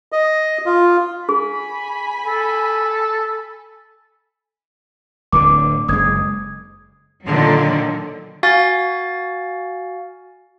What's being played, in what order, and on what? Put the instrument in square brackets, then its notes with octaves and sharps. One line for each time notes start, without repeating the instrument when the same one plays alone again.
[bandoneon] D#5
F4
[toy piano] G#4 [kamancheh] G#5 B5
[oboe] A4
[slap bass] D1 D3 [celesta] D6
[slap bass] F#1 G#3 [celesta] D#6 G#6
[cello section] A#2 D3 D#3 F#3
[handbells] F#4 F5 G#5 A6